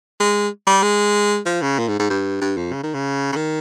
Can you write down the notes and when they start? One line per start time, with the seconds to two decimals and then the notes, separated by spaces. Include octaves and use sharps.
0.20 G#3
0.67 G3
0.83 G#3
1.46 F3
1.62 C#3
1.79 A#2
1.88 G#2
1.99 G#2
2.10 G2
2.41 G2
2.57 F2
2.73 C#3
2.83 D#3
2.94 C#3
3.32 C#3
3.36 D#3